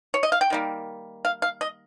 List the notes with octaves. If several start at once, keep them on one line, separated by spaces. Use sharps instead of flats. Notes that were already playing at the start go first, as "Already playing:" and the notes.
C#5
D#5
F5
G5
D#3 G3 A#3
F5
F5
D#5